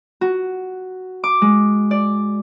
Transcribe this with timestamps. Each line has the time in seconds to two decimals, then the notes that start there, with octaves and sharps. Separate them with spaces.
0.21 F#4
1.24 D6
1.42 G#3
1.91 D5